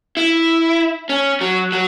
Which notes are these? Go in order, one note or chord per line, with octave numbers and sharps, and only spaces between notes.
E4
C#4
F#3
F#3